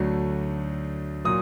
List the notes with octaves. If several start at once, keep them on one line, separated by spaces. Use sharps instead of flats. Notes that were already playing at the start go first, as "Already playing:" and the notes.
Already playing: D2 D3 F#3 A3
A#2 F#3 D#6